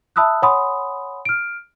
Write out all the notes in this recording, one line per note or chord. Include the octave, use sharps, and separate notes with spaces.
E5 A5 B5 D#6 E6 F#6
C#5 F#5 G#5 B5 C6 D#6
F6 D7